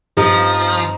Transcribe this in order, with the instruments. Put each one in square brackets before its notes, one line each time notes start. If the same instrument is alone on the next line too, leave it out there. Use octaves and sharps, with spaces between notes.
[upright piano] G2 G3 C4 D#4 [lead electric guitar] F3